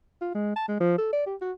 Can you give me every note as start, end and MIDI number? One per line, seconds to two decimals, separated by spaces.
0.21 0.32 65
0.34 0.55 56
0.56 0.66 81
0.68 0.77 56
0.80 0.97 53
0.98 1.12 69
1.12 1.24 74
1.26 1.35 67
1.41 1.52 66